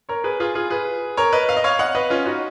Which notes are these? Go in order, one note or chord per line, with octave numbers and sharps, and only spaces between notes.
A#4 C#5
G#4 B4
F4 G#4
F4 G#4
G#4 B4
A#4 C#5
B4 D#5
F5
D#5
C#5 F5
D#5 F#5
B4 D#5
C#4 F4
D#4 F#4